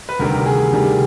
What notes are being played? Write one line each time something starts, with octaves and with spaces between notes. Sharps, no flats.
B4
D2 C3 D#3 G3 A#4
G#4
D2 C3 D#3 G3